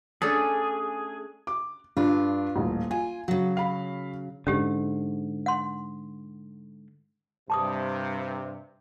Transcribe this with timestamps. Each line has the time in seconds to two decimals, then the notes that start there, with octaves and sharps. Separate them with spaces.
0.22 A3 C#4 D4 G#4
1.47 D6
1.97 G2 D4 F4
2.56 D#1 A1
2.91 F4 G#5
3.28 C#3 F#3 F#4
3.57 F5 B5
4.47 G#2 D3 C#4 G4
5.46 F#5 C6
7.50 G2 C3 A5 D6 D#6